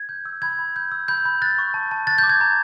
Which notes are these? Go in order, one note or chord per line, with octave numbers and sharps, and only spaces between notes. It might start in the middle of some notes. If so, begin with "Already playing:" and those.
Already playing: G#6
G6
E6
B5 G#6
B5
G6
E6
B5 G6
B5
F#6 A6
C#6
A5
A5
F#6 A6
G6
D6
G#6
A#5